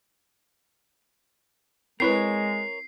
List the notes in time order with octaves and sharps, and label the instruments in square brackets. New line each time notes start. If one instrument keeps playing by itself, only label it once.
[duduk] G#3 [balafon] C4 E4 B4 [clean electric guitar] A#4 C#5 [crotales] C7